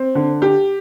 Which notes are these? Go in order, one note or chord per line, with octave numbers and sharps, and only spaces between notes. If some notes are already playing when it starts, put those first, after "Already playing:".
Already playing: C4
D3
G4